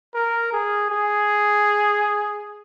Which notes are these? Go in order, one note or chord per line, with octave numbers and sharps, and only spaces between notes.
A#4
G#4
G#4